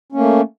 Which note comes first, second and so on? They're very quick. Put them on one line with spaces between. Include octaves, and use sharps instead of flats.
C#4 A#3 A3